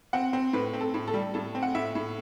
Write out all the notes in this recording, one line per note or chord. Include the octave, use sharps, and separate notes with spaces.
C4 F#5
C4
A2 B4
C4
A4
A2
A4
G3
A2 A4
C4
F#5
A2 E5
A2